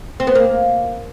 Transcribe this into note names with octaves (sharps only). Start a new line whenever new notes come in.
C4
B3
A#3